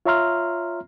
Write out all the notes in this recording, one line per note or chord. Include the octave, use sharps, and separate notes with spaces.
F4 C#5 E5 A#5 C6 F6